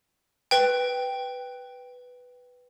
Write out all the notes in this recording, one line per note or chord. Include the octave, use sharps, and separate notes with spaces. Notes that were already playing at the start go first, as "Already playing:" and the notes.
B4 G5